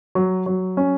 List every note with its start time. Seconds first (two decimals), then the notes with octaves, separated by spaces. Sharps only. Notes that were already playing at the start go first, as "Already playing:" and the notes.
0.15 F#3
0.46 F#3
0.77 C#4